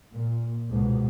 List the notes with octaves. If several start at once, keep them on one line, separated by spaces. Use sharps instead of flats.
A#2
C#2 G#2 B2